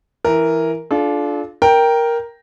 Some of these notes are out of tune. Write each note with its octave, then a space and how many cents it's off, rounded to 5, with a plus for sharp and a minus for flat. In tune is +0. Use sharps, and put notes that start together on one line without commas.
E3 +0 A#4 +0
D4 +0 F4 +0 A4 -40
A#4 +5 G5 +0